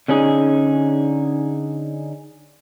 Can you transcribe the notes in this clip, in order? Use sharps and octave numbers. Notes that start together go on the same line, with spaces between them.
D3 C#4 D#4 G#4